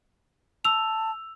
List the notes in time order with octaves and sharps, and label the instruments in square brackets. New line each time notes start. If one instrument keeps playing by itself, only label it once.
[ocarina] A5 [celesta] E6 F7